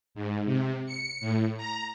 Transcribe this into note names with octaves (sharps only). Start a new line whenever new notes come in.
G#2
C3
C#7
A2
A#5